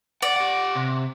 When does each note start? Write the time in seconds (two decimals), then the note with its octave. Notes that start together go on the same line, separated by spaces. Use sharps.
0.22 D5 F#5
0.36 G4 F#5
0.75 C3